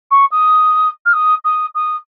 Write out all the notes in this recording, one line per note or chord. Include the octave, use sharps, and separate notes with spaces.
C#6
D#6
F6
D#6
D#6
D#6